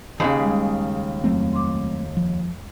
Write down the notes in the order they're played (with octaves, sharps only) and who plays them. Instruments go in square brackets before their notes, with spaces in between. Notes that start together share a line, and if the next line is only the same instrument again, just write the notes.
[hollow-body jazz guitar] D#2 A2 C#3
[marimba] G3 G#3
[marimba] F2 [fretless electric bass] F#3 A3 C4
[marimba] C6 D6
[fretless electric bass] F3